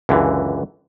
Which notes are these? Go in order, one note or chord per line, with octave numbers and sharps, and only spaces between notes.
C#2 F#2 D3 E3